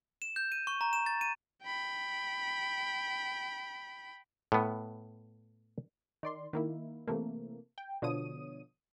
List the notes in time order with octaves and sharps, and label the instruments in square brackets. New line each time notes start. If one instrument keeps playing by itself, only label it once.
[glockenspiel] E7
G6
D#7
C#6
A#5
E7
A6
D#7
[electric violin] G5 B5
[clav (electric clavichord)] A2 B3
[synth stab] D#3 D5 C6
D#3 A#3 E4
C3 E3 A3 A#3
G5
B2 D3 F3 C#5 D#6 D#7